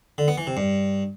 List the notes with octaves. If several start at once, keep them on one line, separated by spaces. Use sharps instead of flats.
D3
B3
E3
C3
G2